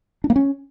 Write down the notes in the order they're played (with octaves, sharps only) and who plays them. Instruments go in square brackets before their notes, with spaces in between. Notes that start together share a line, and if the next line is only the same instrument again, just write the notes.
[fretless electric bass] D4
A#3
C#4